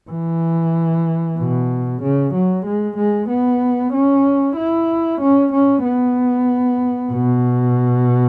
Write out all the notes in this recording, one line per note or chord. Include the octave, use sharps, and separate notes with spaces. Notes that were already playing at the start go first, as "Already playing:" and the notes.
E3
B2
C#3
F#3
G#3
G#3
B3
C#4
E4
C#4
C#4
B3
B2